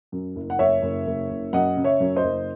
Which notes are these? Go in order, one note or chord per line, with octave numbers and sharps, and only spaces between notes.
F#2
F#1
F#5
F#1 C#5 E5
F#1
F#1
F#1
F#2 D#5 F#5
C#3
C#5 E5
F#2
C5 D#5
F#1